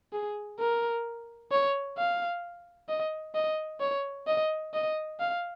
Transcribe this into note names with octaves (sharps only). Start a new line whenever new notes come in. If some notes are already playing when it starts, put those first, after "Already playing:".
G#4
A#4
C#5
F5
D#5
D#5
C#5
D#5
D#5
F5